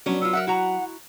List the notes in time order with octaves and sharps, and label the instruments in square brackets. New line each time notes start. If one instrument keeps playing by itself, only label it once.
[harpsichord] F#3 [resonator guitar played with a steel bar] B3 C#4 D4
[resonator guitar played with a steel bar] B3 F4 [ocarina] E6
[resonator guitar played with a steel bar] A#4 E5 F#5
[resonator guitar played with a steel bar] E4 F#4 A#5 [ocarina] F#5